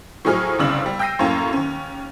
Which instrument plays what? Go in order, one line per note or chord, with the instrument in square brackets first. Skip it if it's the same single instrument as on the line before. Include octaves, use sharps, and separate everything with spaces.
[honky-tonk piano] A2 F3 F#3 G#4 F6
G1 C2 G2 C#3 E6 F#7
G3
G5 E6 G6 A#6 C7 D#7
F#2 A2 A#3 C#4
D#2 C#4